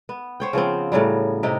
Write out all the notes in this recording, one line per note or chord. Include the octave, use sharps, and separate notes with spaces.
B3
C5 C#5 G5
C#3 F3 B3 C4
A2 C#3 F#3 G3
C3 D#4 G4